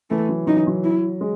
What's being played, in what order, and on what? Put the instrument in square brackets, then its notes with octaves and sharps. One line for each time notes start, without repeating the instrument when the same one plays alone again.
[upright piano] E3 [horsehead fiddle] A3
[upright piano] F#3
[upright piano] F#3 [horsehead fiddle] D#4
[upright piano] E3
F#3
[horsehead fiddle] E4
[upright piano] G#3